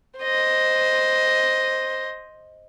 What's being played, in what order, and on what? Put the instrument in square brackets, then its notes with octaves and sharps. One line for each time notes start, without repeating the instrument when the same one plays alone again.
[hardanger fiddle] C5 D#5